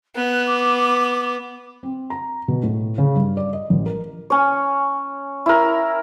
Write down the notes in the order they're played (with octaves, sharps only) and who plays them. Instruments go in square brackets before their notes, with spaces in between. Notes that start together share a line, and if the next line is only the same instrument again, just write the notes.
[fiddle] B3 [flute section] F#6
[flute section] D6
[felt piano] C4
A#5
B2
A2
C#3
G2
D5
D#5
A1
A#4
[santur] C#4 C#5
E4 A#4